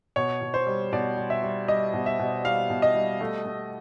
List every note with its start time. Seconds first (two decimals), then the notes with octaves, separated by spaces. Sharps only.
0.16 B2 C#5
0.41 B2
0.54 C5
0.67 G3
0.93 B2 D5
1.18 G3
1.30 E5
1.43 G3
1.68 G3 D#5
1.94 B2
2.06 E5
2.19 B2
2.44 G3 F5
2.70 B2
2.82 D#5
2.95 G3
3.21 A3
3.46 A3